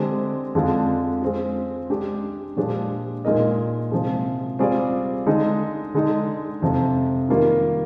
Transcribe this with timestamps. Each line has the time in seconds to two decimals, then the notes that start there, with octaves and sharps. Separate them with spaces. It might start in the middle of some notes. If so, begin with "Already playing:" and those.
Already playing: D3 G#3 C4 G4
0.55 F2 D3 G#3 D4 F4
1.22 G#3 C4 F4
1.90 G#3 D4 G4
2.57 A#2 F3 G#3 D4 G4
3.25 A#2 G#3 D#4 A#4 D#5
3.91 C3 F3 G#3
4.59 G3 C4 F4 G#4 D5
5.27 D3 G#3 D#4
5.94 D3 G#3 D#4
6.62 F2 C3 F3
7.29 D#3 G3 A#3 F4 A#4